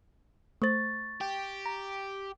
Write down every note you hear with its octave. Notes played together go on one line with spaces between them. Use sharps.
A3 C5 C#6 A6
G4
A#5